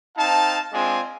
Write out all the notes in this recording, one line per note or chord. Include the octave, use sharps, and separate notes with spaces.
C4 D#4 F5 A5
G#3 C4 D4 F4 G#5